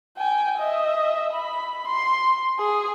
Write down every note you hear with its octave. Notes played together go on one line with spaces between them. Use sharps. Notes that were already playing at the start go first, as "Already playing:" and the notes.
G5 G#5
D#5 E5
B5
C6
G#4